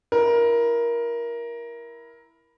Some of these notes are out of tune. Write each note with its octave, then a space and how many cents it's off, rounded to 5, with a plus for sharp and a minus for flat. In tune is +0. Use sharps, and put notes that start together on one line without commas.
E4 +0 A#4 +15